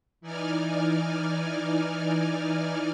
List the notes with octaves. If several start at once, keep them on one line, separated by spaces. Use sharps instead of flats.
E3 D#4 D5 G#5 F6